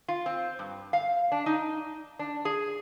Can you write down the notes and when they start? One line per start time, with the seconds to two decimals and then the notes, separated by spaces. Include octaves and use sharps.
0.08 F4
0.26 C4
0.59 G2
0.93 F5
1.32 D4
1.46 D#4
2.19 D4
2.45 G#4